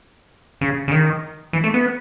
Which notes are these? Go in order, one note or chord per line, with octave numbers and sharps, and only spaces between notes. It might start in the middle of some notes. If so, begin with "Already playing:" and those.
C#3
C#3
D#3
E3
A3
B3